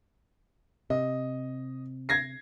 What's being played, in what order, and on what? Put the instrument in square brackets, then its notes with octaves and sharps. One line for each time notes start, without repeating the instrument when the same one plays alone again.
[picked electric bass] C3 [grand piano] D#5
[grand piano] G#6 A#6 C7